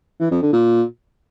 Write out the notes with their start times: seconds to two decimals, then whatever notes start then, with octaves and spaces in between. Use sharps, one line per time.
0.20 E3
0.31 F2
0.42 D3
0.53 A#2